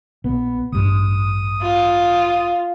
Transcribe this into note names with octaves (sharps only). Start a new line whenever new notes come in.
A#1 B3
A1 G2 D#6
F4